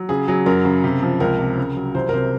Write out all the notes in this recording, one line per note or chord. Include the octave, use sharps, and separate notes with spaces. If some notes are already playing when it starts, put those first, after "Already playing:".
Already playing: F#3
C#3 G#4
F#3 G#4
F#2 A#4
C#3
C3
F3
C#2 A#4
C3
C#3
F#3
C2 C5
A#4
C3 C5